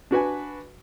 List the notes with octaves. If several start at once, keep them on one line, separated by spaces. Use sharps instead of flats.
D4 F#4 B4 G#5